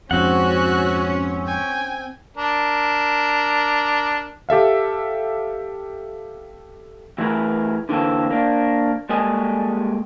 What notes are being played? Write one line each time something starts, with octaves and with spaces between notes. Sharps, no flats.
F2 G#2 C4 C#4 F#4 F#5 F#6
G5 G#5
D4 A#4
G4 A4 E5 F5
E3 A3 E4 G#4 A#4 B4
D3 E3 A#3 C4 A4
A#3 D4
G3 G#3 A#3 G#4 A4 D#5